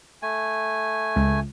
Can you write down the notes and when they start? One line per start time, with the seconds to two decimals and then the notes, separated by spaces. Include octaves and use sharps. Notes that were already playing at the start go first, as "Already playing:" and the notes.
0.23 A3 G#5
1.16 C#2